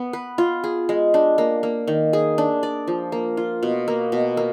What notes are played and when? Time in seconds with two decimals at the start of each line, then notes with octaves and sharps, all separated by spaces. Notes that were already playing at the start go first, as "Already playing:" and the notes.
Already playing: B3
0.13 B4
0.38 F4
0.64 G#4
0.89 G#3
1.14 D4
1.38 A#3
1.63 A#3
1.88 D#3
2.13 G#4
2.38 D4
2.63 D5
2.87 F3
3.12 A#3
3.37 F4
3.63 B2
3.88 A#3
4.12 B2
4.37 A#3